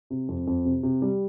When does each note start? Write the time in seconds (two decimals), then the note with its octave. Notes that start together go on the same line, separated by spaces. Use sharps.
0.10 C3
0.28 F2
0.47 F2
0.65 C3
0.83 C3
1.02 G3